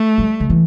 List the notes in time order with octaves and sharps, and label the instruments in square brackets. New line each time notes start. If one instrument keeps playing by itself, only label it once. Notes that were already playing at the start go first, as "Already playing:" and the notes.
Already playing: [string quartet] A3
[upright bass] G3
D3
E3